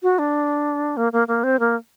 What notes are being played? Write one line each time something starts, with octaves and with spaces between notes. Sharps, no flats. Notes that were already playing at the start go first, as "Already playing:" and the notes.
F#4
D4
A#3
A#3
A#3
C4
A#3